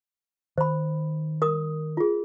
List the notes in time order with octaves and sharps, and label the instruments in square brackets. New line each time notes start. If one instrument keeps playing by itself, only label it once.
[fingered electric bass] D#3 [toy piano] C5 B5
[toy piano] A#4 D#6
F4 G#4